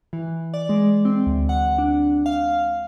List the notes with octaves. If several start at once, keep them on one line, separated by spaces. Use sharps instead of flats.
E3
D5
G#3
C4
D2
F#5
D4
F5